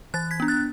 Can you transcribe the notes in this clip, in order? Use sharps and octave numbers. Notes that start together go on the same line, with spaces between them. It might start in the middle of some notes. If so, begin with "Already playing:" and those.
E3 F#6 A6
G#6 B6
B3 D4
F#6 A6